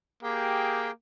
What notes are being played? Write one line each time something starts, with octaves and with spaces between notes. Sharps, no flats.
A#3 G4 G#4 G5